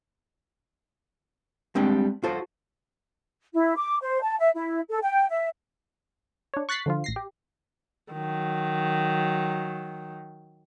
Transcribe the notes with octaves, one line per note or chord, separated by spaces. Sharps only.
G3 G#3 C4 D4
F4 F#4 A4 C5
E4
D6
C5
A5
E5
E4
A4
G5
E5
D4 C#5
C#6 F#6 A6 B6 C7
D3 F3 F4
A1 A#6 C7
G4
D#3 F#3